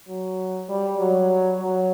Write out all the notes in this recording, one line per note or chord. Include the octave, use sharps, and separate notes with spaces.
F#3
G3
F#3
F#3